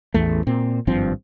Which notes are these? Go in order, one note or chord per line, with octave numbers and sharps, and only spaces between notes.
A1 E2 A3
A#2 C4
G#1 G2 F3 C4